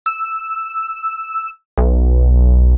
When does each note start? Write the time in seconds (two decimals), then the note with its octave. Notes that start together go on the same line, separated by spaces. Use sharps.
0.06 E6
1.78 B1